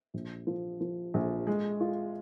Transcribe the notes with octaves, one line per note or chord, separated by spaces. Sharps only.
A#1
F3
F3
A#1
G#3
F4